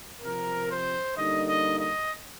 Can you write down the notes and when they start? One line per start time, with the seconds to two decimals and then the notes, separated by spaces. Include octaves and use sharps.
0.21 C3 F3 C4 A#4
0.69 C5
1.16 D3 G3 A#3 D#4 D#5
1.47 D#5
1.78 D#5